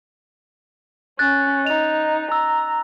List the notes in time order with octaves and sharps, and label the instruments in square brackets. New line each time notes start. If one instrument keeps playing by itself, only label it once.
[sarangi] C#4 [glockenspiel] F#6 A6
[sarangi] D#4 [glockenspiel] F7
[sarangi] A#5 [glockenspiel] E6